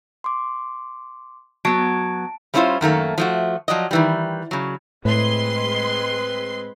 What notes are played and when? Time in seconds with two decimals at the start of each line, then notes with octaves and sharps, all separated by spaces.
0.24 C6 D6
1.65 F#3 B3 A5 D7
2.54 G3 A3 C#4 E4 F4 C5
2.81 F#2 D#3 A3 A#3
3.18 F3 A3 F#4
3.68 F3 F#3 D5 D#5
3.91 D#3 E3 G3
4.51 C#3 F#3
5.05 A2 G#3 C4 B4 C6